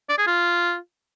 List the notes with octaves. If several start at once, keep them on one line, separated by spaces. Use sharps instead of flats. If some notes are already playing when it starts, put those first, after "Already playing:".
D5
G#4
F4